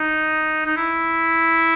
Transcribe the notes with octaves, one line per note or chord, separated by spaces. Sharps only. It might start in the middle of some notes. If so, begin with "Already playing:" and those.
Already playing: D#4
D#4
E4